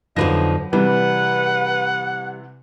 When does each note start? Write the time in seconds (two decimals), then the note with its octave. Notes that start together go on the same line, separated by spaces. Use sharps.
0.16 F2 D3 F3 F#3 D#4 B4 A#6
0.73 C3 E3 G3 B4 F#5